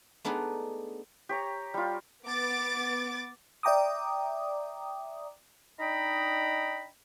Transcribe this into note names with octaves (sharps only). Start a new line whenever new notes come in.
A3 B3 D4 D#4 G#4 B4
G4 C#5 A#5
G3 F4
B3 D6 A6
D5 E5 G5 A#5 D6 D#6
D4 D#4 D#5 G5 A#5 B5